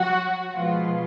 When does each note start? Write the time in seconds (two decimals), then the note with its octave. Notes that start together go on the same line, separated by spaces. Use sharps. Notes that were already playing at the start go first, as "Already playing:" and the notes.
Already playing: F#3 F#4
0.55 B2 F3 G#3 F4